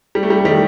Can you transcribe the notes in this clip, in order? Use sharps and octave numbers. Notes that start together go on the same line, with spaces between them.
G3
A3
G3
A3
D#3 G3